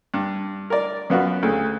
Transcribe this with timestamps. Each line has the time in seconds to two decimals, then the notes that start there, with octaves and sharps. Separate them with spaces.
0.14 G2
0.70 A#4 D5
1.10 F#2 B3 F4 F#4
1.43 D2 C#3 A3